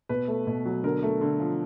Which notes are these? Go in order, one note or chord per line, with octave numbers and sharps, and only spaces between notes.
B2 B4
A3
B2
F#3
D3 A#4
A3
D3
F3